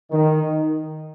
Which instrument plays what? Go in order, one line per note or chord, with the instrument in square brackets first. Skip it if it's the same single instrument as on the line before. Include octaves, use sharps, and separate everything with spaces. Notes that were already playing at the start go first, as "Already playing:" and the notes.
[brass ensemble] D#3